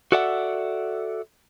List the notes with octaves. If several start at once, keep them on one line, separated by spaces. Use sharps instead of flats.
F#4 A4 D5 E5 F#5